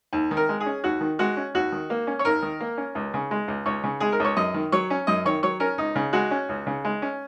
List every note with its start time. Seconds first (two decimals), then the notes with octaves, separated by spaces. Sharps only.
0.13 D#2
0.31 D#3
0.37 A#4
0.49 G#3
0.60 G#4
0.66 C#4
0.84 D#2 F#4
1.01 D#3
1.19 G#3 F#4
1.37 C#4
1.54 D#2 F#4
1.72 D#3
1.90 A#3
2.07 C#4
2.19 C#5
2.25 D#2 A#4
2.42 D#3
2.60 A#3
2.77 C#4
2.95 C#2
3.14 C#3
3.31 G#3
3.48 C#2
3.66 C#2 C#5
3.84 C#3
4.00 G#3 G#4
4.12 A#4
4.20 C#2 C#5
4.37 F#2 D#5
4.54 D#3
4.72 F#3 C#5
4.90 C#4
5.07 F#2 D#5
5.25 D#3 C#5
5.43 F#3 C#5
5.60 C#4 A#4
5.78 C#2 D#4
5.95 C#3
6.13 G#3 F#4
6.31 C#4
6.49 C#2
6.67 C#3
6.85 G#3
7.02 C#4